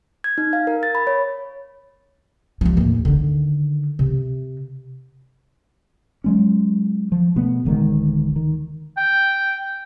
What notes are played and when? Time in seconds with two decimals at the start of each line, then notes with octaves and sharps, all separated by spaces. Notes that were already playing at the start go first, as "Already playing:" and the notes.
0.24 G#6
0.38 D#4
0.53 F5
0.67 A#4
0.83 A6
0.95 B5
1.07 C#5
2.61 F3 G3
2.77 D#2 A2
3.05 D3 D#3
3.99 C3
6.24 F#3 G#3 C#4
7.12 F3
7.36 B2 A3 B3
7.65 D1 D3 D#3 G#3
8.36 D#3
8.97 G5